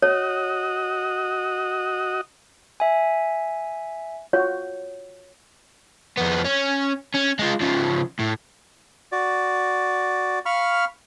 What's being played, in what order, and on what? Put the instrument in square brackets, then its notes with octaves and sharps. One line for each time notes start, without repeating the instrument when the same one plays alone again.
[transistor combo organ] F#4 D#5 [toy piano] C#5
[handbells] E5 G#5
[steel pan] F4 F#4 [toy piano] C#5
[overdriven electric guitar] F2 B3
C#4
C#4
G#3 F4
C#3 F3
A2
[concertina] F#4 D5
F5 B5 C#6 F6